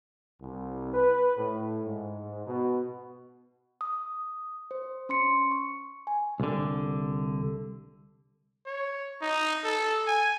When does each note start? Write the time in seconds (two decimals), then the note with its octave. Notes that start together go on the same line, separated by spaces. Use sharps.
0.42 C2
0.94 B4
1.37 A2
1.85 G#2
2.46 B2
3.81 D#6
4.71 C5
5.09 C#4 C6 C#7
5.51 C#6
6.07 G#5
6.40 C2 D3
8.66 C#5
9.22 D#4
9.64 A4
10.07 G#5